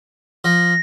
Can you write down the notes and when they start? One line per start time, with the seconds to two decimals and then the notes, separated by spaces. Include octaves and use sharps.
0.44 F3 A#6